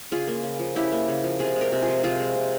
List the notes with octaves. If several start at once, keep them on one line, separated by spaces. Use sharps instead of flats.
C#3 F4 G#4
A#3
C#3
F3
C#3 E4 G4
A#3
C#3
F3
C3 F4 G#4
G#3
G4 A#4
C3
F4 G#4
F3
C3 F4 G#4
G#3
C3